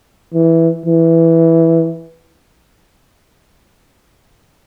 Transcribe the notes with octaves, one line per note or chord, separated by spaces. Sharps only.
E3
E3